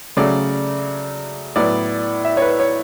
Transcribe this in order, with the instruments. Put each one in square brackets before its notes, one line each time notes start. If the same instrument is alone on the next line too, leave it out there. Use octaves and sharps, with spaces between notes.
[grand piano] C#3 F#3 A3 D5
A2 F#3 B3 D5
E5
C#5
B4
C#5